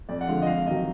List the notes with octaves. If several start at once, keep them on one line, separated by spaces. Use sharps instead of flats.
F2 D5
F#5
D3 F3 G#3 F5
D#5
F2 F5
D#3 F#3 D#5